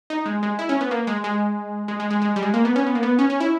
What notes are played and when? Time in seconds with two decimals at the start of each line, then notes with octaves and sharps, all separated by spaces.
0.10 D#4
0.26 G#3
0.43 G#3
0.59 E4
0.69 C#4
0.81 B3
0.91 A#3
1.07 G#3
1.24 G#3
1.88 G#3
2.00 G#3
2.11 G#3
2.22 G#3
2.36 G3
2.42 G#3
2.54 A#3
2.65 B3
2.76 C#4
2.87 B3
2.95 A#3
3.03 B3
3.19 C#4
3.30 C#4
3.40 E4